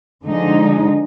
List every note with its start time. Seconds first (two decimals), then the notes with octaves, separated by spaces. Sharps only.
0.24 D3 F3 G#3 D#4